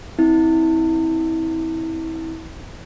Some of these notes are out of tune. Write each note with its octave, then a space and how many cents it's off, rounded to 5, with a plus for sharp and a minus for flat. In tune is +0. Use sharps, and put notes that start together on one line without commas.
C4 +0 E4 -30